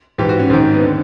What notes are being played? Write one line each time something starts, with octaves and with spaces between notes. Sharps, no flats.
G#2 E3 G4
F#4
C#4
G#2 D#3 C4
B3
D3 C4